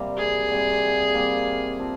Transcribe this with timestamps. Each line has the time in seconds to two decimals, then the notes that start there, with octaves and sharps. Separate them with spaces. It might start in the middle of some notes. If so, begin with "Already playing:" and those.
Already playing: C3 G3 A#3
0.18 G#4
0.50 C3 G3 A#3
1.14 C3 G3 A#3
1.79 F3 C4